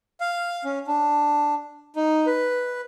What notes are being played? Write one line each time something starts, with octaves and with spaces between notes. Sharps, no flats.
F5
C#4
D4
D#4
B4